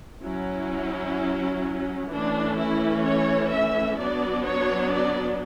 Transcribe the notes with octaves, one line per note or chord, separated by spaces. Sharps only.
F#3 C#4 E4
E3 A3 C#4 D4
E4
C#5
E5
F#3 B3 D4 D5
C#5
D5